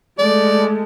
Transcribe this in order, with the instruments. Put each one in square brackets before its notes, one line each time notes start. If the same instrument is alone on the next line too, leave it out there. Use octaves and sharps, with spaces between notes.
[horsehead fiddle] G#3 A3 [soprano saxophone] D5